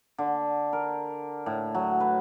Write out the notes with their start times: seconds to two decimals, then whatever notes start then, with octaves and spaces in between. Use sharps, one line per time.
0.18 D3
0.73 A#4
1.46 A2
1.75 F#3
2.00 B4